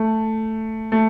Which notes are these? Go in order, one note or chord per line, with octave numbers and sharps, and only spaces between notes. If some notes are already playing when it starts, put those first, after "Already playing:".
Already playing: A3
A3